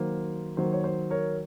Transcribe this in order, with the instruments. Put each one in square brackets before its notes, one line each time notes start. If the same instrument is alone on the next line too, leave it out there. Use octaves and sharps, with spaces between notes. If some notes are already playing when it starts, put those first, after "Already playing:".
Already playing: [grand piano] D#3 F#3 A#3 C5
D#3 F#3 A#3 C5
C#5
C5
A#4 C#5